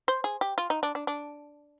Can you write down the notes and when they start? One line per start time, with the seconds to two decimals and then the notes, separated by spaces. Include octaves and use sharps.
0.08 C5
0.24 G#4
0.41 G4
0.58 F4
0.70 D#4
0.83 D4
0.95 D4
1.07 D4